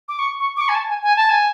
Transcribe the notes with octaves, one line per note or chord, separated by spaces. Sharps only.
D6
C#6
C#6
D6
C#6
G#5
A5
G#5
G#5
A5
G#5